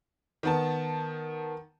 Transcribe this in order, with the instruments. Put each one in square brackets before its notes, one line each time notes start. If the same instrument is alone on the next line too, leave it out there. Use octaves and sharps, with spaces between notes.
[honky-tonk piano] D#3 B3 A5